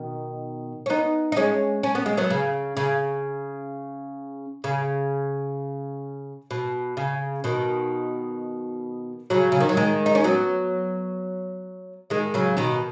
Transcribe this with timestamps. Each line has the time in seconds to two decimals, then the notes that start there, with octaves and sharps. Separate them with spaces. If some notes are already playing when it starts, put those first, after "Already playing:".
Already playing: B2 D#3
0.86 C#4
0.90 B3 D#4
1.32 D#4
1.37 G#3 C#4
1.83 C#4
1.95 B3
2.06 G#3
2.17 F#3 B3
2.30 C#3
2.77 C#3
4.64 C#3
6.51 B2
6.97 C#3
7.44 B2 D#3
9.30 C#3 F#3
9.52 C#3
9.60 D#3
9.69 F#3
9.77 D#3 G#3
10.06 D#4
10.15 C#4
10.24 F#3 B3
12.10 D#3 G#3
12.34 C#3 F#3
12.57 B2 D#3